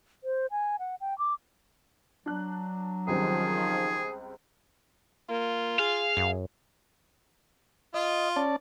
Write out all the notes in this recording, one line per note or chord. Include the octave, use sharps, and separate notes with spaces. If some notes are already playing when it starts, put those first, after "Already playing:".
C5
G#5
F#5
G5
D6
F#3 D4 F#6
C#2 D#3 F3 G3 C4 G#4
A#3 F4
G#4 F5
F#2
F4 D#5
C#4 D5 A5